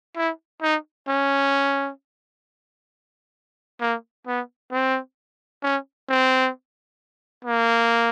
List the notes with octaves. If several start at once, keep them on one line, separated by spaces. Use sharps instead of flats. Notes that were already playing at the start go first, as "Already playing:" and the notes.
E4
D#4
C#4
A#3
B3
C4
C#4
C4
A#3